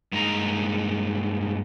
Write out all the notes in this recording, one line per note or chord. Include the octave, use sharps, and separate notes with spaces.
G2 G#3 A#3 D#4 G#4 A#5